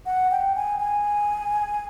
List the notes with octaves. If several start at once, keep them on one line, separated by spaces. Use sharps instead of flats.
F#5
G5
G#5
G#5